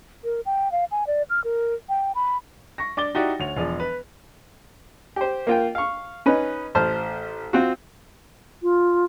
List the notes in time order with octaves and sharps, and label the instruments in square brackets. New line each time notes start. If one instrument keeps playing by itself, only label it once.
[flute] A#4
G5
F5
G#5
D5
F6
A#4
G5
B5
[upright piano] C#6 A#6
D4 D6 A6 G7
D#4 E4 F#4 G4 D5
D2 C#5 F7
E1 F3 G#4 D5
B4
[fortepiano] G4 C5
A#3 F4 G5
F5 C#6
C#4 D#4 B4
A1 C5 A5 F6
C4 F4 F#4
[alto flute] F4